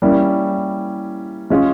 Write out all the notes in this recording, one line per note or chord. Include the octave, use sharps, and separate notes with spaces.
G3 A#3 C#4 E4
G#3 C#4 F4 G#4